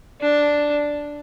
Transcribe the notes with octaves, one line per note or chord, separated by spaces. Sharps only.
D4